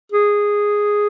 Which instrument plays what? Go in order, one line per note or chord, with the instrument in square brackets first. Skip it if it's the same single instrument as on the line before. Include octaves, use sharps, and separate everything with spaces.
[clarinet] G#4